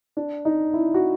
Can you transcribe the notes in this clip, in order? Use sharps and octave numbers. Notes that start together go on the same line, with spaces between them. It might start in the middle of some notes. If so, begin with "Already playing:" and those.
D4
D#4
E4
F#4